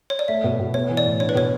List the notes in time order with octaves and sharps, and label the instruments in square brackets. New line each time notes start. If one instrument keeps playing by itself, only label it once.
[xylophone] C#5
D5
[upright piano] A3 [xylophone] E5
[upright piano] B2
B2
[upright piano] B3 [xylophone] C#5
[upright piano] E3
[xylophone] D5
[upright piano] A2
[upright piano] D4 [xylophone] C#5
[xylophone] B4
[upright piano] B2 [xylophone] C#5